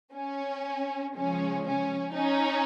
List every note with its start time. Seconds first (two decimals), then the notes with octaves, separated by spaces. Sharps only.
0.15 C#4
1.15 C#3 F3 G#3 C#4
1.66 C#4
2.15 C#4 D#4